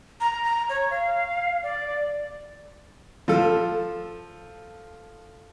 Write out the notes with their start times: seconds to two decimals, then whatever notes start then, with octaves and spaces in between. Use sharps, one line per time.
0.20 A#5
0.44 A#5
0.69 C#5
0.91 F5
1.63 D5
3.28 F3 A4